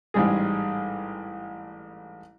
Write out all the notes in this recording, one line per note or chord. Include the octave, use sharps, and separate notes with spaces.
A1 G#2 G3 G#3 G#4